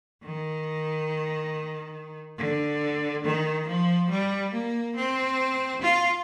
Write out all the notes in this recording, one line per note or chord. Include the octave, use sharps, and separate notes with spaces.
D#3
D3
D#3
F3
G3
A#3
C4
F4